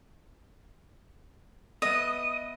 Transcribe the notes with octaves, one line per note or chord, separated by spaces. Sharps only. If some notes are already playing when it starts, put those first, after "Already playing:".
B3 D#5 E5 D#6